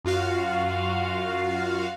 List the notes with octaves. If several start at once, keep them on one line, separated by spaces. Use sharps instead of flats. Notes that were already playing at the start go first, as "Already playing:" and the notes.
F#2 F4 F#4 F5